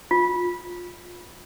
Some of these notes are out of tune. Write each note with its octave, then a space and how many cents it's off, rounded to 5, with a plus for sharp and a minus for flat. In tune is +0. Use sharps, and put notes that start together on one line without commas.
F4 +15